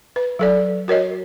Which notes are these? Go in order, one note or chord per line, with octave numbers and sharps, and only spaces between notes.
B4
F#3 A4 D5
F#4 A#4 C#5 D#5